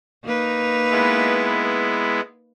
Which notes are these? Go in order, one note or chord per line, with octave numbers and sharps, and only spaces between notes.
A#3 D#4 B4
G#3 B3 E4